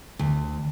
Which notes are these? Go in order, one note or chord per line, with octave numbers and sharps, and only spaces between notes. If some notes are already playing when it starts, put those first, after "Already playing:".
D2